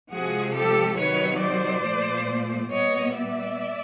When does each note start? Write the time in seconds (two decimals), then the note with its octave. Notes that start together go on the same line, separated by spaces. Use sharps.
0.11 C3 F3 G#3 F#4 G#4
0.56 G4 A4
0.98 C3 D#3 F#3 B4 C#5
1.42 C5 D5
1.85 A#2 F3 A3
2.72 A#2 G3 B3 C#5 D#5
3.15 D5 E5